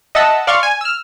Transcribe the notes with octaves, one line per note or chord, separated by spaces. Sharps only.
D#5 E5 F#5 A5 E6
D5 F5 C6 C#6 F6
G#5
E6 F6